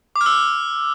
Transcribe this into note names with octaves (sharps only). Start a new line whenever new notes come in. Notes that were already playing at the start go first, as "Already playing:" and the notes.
D6
F6
E6